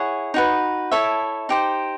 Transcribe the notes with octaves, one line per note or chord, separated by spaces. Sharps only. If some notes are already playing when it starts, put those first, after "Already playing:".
Already playing: E4 G#4 C#5 F#5
D#4 F#4 B4
E4 A4 C#5 E5
D#4 G4 C5